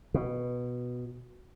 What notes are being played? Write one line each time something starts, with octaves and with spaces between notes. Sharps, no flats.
B2